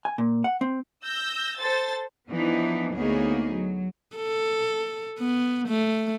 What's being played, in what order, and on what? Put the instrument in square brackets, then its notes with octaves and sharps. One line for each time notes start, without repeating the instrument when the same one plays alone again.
[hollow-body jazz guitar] G#5
A#2
F#5
C4
[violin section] E6 G6 A#6
A4 C5 A6
[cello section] E3 F3 B3 D4 D#4
D2 A#3 B3 D#4 G#4 C#5
F#3
[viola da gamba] A4
B3
A3